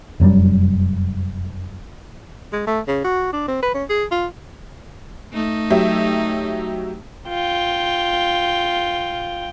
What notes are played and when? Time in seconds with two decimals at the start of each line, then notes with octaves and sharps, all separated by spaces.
0.20 F1 F#2 F#3 G3
2.53 G#3
2.67 A3
2.88 C#3
3.04 F#4
3.33 D4
3.48 C4
3.63 B4
3.74 C#4
3.89 G#4
4.11 F4
5.33 A3 D#4
5.71 F#3 G4 E5
7.28 F4 G5